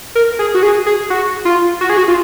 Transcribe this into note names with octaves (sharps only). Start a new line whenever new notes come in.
A#4
G#4
F#4
G#4
G#4
F#4
F4
F#4
G#4
F#4
F4